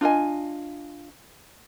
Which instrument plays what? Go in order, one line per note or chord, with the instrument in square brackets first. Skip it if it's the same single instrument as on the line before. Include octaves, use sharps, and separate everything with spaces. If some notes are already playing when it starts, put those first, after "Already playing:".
[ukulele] D4 F4 D#5 G#5